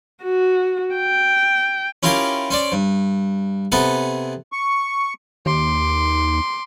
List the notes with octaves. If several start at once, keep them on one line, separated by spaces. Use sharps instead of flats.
F#4
G5
C#4 E4 F4 G4 A#4 C6
C#4 C5 D5
G2
C3 B3 A4 G#5
C#6
D#2 C6 D6